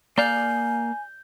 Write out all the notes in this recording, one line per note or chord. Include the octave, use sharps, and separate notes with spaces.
A#3 D5 F5 G#5 G6 G7